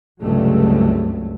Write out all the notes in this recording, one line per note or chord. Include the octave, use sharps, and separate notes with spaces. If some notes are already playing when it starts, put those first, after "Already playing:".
C#2 G2 C3 F#3 A3